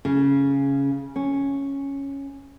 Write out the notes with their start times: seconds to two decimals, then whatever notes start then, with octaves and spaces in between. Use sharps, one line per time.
0.05 C#3
1.16 C#4